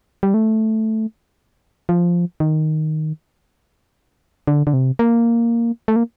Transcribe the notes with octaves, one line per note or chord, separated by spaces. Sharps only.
G3
A3
F3
D#3
D3
D3
C3
A#3
A3
A#3